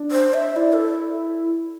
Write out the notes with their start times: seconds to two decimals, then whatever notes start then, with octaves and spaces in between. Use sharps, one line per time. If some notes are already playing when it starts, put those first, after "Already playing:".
Already playing: D4
0.12 C5
0.34 E5
0.56 E4 D5
0.73 A4